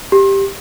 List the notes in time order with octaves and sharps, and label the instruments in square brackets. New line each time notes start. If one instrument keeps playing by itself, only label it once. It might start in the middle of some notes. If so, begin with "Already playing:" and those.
[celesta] G4